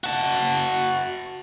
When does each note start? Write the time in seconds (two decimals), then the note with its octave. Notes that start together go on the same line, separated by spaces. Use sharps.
0.04 F#4 A5